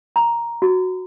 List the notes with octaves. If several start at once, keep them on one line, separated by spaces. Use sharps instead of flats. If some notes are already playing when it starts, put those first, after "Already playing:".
A#5
F#4